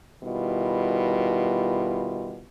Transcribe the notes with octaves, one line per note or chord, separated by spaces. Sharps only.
B2 D#3 G3 E4 F4